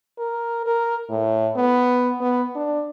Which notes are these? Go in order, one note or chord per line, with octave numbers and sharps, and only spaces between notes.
A#4
A#4
A2
B3
B3
D4